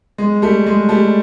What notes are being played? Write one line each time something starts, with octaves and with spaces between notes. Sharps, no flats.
G#3
G3 A3
G#3
G3 A3